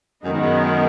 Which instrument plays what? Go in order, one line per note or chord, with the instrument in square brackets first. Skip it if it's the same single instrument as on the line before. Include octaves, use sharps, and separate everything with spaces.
[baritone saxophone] F#2 [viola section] D#3 G#3 B3
[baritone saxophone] G#2
F#2